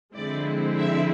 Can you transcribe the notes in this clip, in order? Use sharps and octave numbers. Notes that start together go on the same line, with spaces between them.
D3 F3 G#3 C4 E4 D5
E5